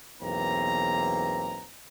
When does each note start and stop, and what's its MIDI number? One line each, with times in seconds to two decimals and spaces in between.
0.21 1.64 35
0.21 1.64 40
0.21 1.64 58
0.21 1.64 60
0.21 1.64 82